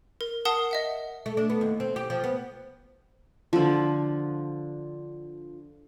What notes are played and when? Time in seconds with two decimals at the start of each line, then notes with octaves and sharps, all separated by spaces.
0.21 A#4
0.45 A#4 F#5 A5 D#6 C7 G7
0.71 D#5 E5 F#5
1.26 A3
1.37 D4
1.50 B3
1.61 D#2
1.80 C4
1.96 G4
2.10 F3
2.24 B3
3.53 D3 F3